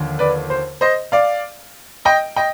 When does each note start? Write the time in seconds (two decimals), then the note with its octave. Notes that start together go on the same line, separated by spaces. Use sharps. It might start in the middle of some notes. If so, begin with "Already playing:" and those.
Already playing: D#2 D3 F3
0.19 B4 D5
0.50 C5
0.81 C5 D#5
1.12 D5 F5
2.05 D#5 G5
2.36 D#5 G5